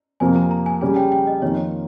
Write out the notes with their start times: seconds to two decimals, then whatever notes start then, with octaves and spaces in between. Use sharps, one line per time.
0.20 F2 C3 F3 A#3 G#5
0.36 A#5
0.51 A#5
0.66 G#5
0.81 C#3 G3 C#4 G4 G#5
0.96 G5
1.12 G5
1.27 D#5
1.42 F2 D#3 A#3 F4 C#5